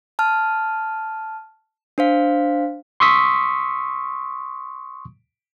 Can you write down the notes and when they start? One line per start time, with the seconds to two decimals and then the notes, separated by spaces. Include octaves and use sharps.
0.19 A5 F6
1.98 D4 C5 F5
3.00 C6 C#6 D#6 E6 B6